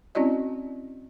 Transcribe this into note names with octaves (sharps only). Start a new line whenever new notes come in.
C4 C#4 E4 F#4 D5 D#5